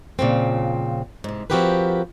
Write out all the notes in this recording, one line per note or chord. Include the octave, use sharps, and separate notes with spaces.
A#2 C#3 F3 C4
G#2 C3
F3 C4 F#4 G4 A#4 B4